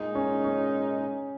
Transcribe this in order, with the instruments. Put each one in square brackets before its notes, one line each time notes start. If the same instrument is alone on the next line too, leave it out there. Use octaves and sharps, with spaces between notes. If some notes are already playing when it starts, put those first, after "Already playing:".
Already playing: [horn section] A#2 G#3 D#4
[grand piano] C#4
C#4